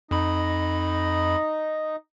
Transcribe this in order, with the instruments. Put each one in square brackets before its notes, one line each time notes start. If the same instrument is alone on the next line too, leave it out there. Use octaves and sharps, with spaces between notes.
[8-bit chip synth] F2 B5 [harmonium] D#4 D#5